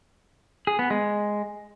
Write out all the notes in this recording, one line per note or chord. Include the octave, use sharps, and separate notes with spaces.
G#4
B3
G#3